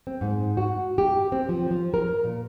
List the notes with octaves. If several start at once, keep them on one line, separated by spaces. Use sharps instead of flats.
C4
G#2
F#4
G4
C4
F3
F3
A#4
A#2